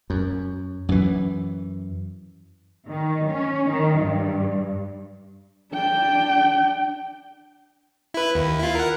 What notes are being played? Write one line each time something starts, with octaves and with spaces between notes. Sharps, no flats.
F#2
F#2 E3
D#3
C#4
D#3
G2
D4 G5
E4 B4
D#2
E4 F4
A#4 F#5